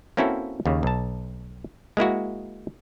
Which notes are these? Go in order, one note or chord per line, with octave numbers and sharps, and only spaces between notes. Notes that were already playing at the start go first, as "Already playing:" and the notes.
A#3 C4 C#4 E4 F#4 A4
D#2 C#3
B1 A5
G#3 A#3 E4 F#4